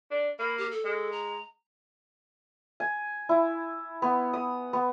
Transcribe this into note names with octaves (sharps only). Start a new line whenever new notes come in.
D4
A#3 B5
G4
A4
G#3
A#5
G#5
E4
B3
D#6
B3